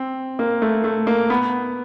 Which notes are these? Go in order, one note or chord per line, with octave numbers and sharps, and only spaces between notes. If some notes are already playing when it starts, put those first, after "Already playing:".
Already playing: C4
A#3
A3
A3
A#3
B3